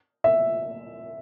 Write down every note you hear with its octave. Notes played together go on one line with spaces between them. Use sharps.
E5